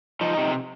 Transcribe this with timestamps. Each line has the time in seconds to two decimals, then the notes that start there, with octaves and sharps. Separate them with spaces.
0.21 F3 D#4
0.37 C3